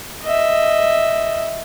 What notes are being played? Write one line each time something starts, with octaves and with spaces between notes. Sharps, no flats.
D#5 E5